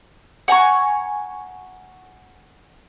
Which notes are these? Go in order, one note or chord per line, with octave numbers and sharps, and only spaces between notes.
F#5 G#5 A#5 C#6